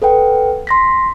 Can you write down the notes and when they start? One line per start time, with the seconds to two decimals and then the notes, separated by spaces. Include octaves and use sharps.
0.02 A4 B4 F#5 G5
0.67 C6 A#6 B6